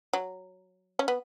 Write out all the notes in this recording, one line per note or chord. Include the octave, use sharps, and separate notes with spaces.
F#3
C#4
B3